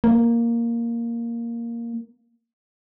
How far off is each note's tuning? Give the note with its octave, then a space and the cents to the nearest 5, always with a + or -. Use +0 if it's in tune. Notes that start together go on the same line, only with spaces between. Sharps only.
A#3 +0